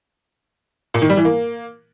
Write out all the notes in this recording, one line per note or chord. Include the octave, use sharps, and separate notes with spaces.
A#2
D#3
G3
E3
A#3